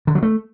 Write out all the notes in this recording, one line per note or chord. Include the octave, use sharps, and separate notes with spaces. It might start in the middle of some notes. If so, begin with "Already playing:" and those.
D3
F#3
A3